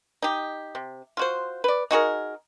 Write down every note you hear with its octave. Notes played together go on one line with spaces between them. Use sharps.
D#4 G4
C3
F4 F#4 C5
B4 D5
D#4 F#4 G#4 A#4